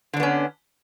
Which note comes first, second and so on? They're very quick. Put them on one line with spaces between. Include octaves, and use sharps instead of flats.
D3 D4 B3 C#4